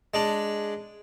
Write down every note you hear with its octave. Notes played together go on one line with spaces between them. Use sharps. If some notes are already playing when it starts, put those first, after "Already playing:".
G#3 D4